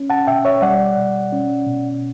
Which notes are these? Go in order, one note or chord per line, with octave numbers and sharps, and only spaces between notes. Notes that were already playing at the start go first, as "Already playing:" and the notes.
Already playing: C#4
F#5 A5
B2 E5 G5
C#5 E5
G3 D5 F#5
B2
C#4
B2